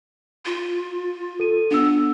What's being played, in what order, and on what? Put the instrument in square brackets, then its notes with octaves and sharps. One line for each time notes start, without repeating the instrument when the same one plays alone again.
[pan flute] F4
[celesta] A4 D#7
[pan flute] B3 [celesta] D4 E6